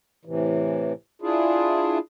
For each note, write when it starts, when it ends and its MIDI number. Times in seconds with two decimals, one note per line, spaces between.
0.25 0.93 45
0.25 0.93 48
0.25 0.93 52
1.22 1.98 62
1.22 1.98 64
1.22 1.98 65
1.22 1.98 68